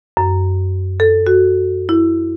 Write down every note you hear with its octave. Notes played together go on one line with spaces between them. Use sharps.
F#2
A4
F#4
E4